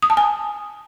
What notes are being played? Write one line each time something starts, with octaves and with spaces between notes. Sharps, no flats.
D#6
A5
G#5